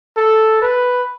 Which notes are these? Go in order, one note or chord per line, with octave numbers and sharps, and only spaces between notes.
A4
B4